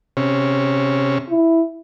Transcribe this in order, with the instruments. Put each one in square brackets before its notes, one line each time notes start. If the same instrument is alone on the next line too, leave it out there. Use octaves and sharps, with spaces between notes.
[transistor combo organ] C3 C#4
[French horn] E4